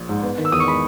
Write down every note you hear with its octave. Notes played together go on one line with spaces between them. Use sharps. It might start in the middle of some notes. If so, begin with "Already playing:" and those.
Already playing: A#1
G#2
B3
D#3
E6
E2 D#6
C#6
G#3 B5